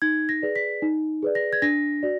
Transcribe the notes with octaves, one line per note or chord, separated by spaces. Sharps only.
D#4 G#6
A#6
G#4 B4 D5
B6
D#4
G#4 B4 D5
A#6
G#6
D4 A#6
F#4 D5